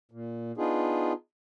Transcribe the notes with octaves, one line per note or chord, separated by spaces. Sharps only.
A#2
B3 D4 D#4 F4 G#4